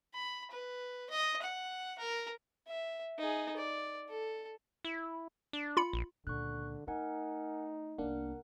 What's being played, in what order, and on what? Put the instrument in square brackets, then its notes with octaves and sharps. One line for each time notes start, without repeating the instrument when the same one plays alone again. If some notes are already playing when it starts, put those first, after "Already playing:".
[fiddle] B5
B4
D#5
F#5
A#4
[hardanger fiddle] E5
D#4 G#4
D5
A4
[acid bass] E4
D4
[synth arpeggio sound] F4 B5 C#7
[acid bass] A#1
[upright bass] C#2 A#2 [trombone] D3 [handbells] C#6 F#6
[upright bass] A3 [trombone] D#4 [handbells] A#4 F#5 G#5
[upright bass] C2 B3 [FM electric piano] A#3 D4 [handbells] A#4 F#5